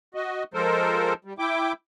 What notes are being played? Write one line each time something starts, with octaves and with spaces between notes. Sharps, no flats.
F#4 D#5
F3 G#3 A4 A#4 C5
G3
E4 G5 D6